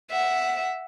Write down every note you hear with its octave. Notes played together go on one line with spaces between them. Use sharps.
E5 F#5